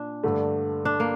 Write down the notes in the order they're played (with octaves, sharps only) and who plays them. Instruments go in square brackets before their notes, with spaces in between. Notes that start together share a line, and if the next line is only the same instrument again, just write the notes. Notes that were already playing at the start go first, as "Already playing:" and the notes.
Already playing: [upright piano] A#2 [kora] D4
[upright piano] G2 D3 A3
[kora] D4
A#3